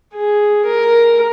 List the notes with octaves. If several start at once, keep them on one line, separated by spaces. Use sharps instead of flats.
G#4
A#4